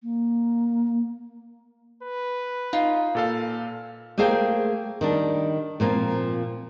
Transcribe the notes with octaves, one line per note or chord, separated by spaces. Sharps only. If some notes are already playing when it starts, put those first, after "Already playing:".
A#3
B4
D#4 F4
A#2 A4 F5
A3 A#3 G#4 C5 F5 G5
D#3 G3 D4
A#2 F3 A#3 C4